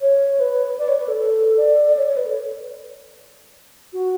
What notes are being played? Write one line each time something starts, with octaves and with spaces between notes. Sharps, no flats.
C#5
B4
D5
C#5
B4
A4
A4
D5
C#5
C#5
B4
A4
F#4